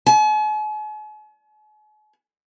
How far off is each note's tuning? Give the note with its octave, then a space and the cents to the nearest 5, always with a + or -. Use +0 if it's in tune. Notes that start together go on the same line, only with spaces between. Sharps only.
G#5 +45